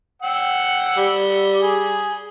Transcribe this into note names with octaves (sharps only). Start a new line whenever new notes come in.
F#5 G5 E6
G3
G#4